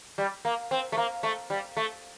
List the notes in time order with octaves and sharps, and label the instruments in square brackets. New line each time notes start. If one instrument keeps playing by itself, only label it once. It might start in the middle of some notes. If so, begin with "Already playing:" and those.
[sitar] G3
A#3
C4
A3
A#3
A3
G3
A3